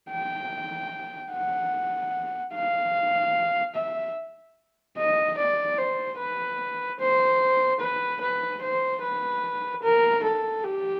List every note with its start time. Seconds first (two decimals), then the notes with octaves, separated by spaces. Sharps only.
0.11 G5
1.33 F#5
2.54 F5
3.75 E5
4.97 D#5
5.38 D5
5.78 C5
6.19 B4
7.00 C5
7.81 B4
8.21 B4
8.62 C5
9.02 B4
9.83 A#4
10.24 A4
10.63 G4